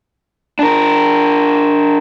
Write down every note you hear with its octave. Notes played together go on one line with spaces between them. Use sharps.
D4 A#4